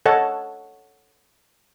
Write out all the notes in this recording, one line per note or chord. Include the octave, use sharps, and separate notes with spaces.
A4 C#5 D#5 F#5 A5